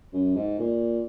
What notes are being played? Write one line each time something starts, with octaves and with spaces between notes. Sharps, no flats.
F#2
G#2
A#2